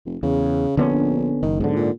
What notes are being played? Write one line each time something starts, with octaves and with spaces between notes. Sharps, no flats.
F1
E2 C#3
A#1 D3 B3 C#4
F#1 D#3
B1 G#2 D3
A#2